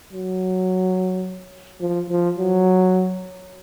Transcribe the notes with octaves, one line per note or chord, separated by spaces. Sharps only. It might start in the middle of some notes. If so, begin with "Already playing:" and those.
F#3
F3
F3
F#3